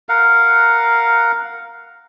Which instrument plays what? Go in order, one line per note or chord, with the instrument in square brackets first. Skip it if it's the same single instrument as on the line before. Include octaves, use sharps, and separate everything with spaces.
[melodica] A#4 F5 F#5